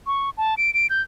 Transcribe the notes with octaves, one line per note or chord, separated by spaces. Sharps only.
C#6
A5
D7
D7
G6